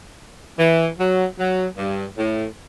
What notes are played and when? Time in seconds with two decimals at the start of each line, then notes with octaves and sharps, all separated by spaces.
0.59 E3
0.98 F#3
1.38 F#3
1.77 G2
2.17 A2